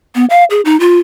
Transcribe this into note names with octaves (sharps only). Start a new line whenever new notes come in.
B3
F5
G#4
D#4
F4